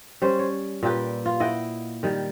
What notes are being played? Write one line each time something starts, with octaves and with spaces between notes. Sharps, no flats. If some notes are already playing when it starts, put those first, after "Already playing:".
G3 C#4 C5
C#5
A#2 G3 G4 B4
F4
E4 D#5 F#5 G5
D#3 G3